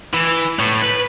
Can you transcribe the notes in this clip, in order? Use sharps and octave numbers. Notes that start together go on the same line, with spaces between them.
E3
A2
B4